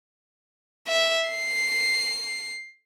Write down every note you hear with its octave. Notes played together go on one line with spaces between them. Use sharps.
E5
C7